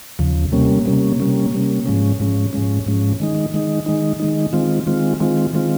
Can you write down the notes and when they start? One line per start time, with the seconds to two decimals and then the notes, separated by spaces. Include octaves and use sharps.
0.19 D#2 C#3 F3
0.52 C3 G3 A#3 C#4
0.86 C3 G3 A#3 C#4
1.20 C3 G3 A#3 C#4
1.53 C3 G3 A#3 C#4
1.86 G#2 F3 G#3 C#4
2.20 G#2 F3 G#3 C#4
2.53 G#2 F3 G#3 C#4
2.86 G#2 F3 G#3 C#4
3.20 D#3 G#3 D#4
3.54 D#3 G#3 D#4
3.86 D#3 G#3 D#4
4.20 D#3 G#3 D#4
4.53 D#3 G#3 C4 F4
4.86 D#3 G#3 C4 F4
5.20 D#3 G#3 C4 F4
5.53 D#3 G#3 C4 F4